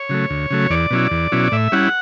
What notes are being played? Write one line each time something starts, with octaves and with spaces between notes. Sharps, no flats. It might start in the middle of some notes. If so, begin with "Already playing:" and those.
Already playing: C#5
C#3 F#3 A3
D2
C#3 F#3 A3
E2 D5
B2 F#3 C#4 E4
E2
B2 F#3 C#4 E4
A2 E5
G3 C#4 E4 F#5